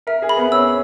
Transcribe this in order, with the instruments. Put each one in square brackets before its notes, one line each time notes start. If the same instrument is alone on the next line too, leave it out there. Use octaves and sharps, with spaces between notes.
[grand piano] A#4 [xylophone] E5
[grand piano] G#4
[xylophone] B5
[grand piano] B3
[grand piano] C#4 [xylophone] E6